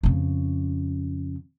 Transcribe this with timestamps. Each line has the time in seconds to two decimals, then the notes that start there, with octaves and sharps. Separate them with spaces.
0.03 F2 C#3